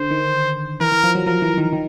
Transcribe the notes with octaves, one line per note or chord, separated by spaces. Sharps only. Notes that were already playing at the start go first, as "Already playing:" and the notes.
Already playing: D3 C5
D#3
E3 A#4
E3
F3
F#3
F3 A#4
E3
D#3
D#3